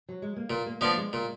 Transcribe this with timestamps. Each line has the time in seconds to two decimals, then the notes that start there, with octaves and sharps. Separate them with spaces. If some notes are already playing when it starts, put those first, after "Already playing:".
0.09 F#3
0.22 G#3
0.36 A#3
0.50 A#2 B3
0.66 A#3
0.81 F3 A#3 B3 D4
0.97 G#3
1.13 A#2